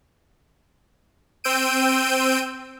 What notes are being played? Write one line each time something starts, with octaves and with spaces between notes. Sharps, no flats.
C4 E6 G6 D7 D#7